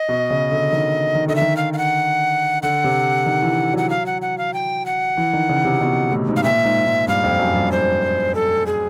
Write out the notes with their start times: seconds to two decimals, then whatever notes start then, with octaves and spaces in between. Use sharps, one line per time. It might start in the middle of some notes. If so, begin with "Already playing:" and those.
Already playing: D#5
0.09 B2
0.30 C#3
0.51 D3
0.72 D#3
1.15 D#3
1.28 D3 D#5
1.36 E5
1.41 D#3
1.57 F5
1.73 F5
1.78 F#5
2.63 D3 F#5
2.84 C3
3.26 D#3
3.42 E3
3.74 F#3 F#5
3.90 F5
4.06 F#5
4.22 F#5
4.38 F5
4.54 G5
4.86 F#5
5.17 E3
5.33 D#3
5.49 C#3
5.65 C3
5.81 B2
6.12 A2
6.28 G#2
6.36 F5
6.44 A#2 E5
6.65 G#2
6.86 G#2
7.08 G2 F5
7.24 F2
7.39 F#2
7.55 G2
7.72 C5
8.35 A4
8.66 G#4